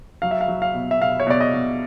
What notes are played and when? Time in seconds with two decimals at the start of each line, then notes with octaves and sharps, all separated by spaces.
0.22 F#3 F5
0.31 E5
0.41 F5
0.48 F#3
0.62 F5
0.75 B2
0.91 E5
1.01 B2 F5
1.20 C#5
1.27 B2 D5
1.41 D#5
1.54 B2